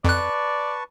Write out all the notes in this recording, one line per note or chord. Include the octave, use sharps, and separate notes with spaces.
F2 B4 D5 A5 C#6 F#6